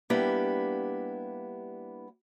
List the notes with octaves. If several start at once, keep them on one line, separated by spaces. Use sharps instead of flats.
G3 A#3 B3 D4 E4 G4